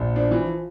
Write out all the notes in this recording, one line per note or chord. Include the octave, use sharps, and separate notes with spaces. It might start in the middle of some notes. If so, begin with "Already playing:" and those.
Already playing: A#1
F3 D4
E3
F3